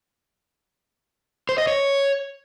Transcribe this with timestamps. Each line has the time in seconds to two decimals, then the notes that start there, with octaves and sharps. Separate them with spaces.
1.49 C5
1.58 D#5
1.67 C#5